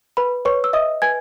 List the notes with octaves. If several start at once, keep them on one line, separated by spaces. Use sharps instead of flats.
B4 B5
B4 C#5 C#6
E6
D#5 E5 D#6
B4 G#5 G#6